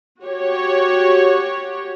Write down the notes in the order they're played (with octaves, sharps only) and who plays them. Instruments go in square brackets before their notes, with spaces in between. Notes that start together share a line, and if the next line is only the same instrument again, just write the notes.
[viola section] F#4 G4 C#5